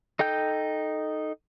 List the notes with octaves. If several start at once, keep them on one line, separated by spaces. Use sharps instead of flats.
D#4 A4 G5 G6